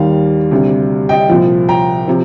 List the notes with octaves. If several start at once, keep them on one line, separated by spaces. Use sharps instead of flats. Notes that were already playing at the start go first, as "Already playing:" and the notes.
Already playing: D#2 D#3 G3 F5
D2 C3 G3
D#5 G5
C2 A#2 F3
G5 A#5
C3 F3